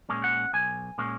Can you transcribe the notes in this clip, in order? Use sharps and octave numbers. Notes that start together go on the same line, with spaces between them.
A#2 G#3 C#4
F#5
B1 G#5
A#2 G#3 C#4